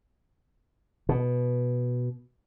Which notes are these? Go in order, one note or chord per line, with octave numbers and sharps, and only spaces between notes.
B2